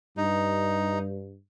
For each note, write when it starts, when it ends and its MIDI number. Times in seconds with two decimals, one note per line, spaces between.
0.17 1.36 43
0.17 0.99 63